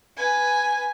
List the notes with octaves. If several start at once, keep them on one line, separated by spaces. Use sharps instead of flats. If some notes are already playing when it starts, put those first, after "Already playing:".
B4 G#5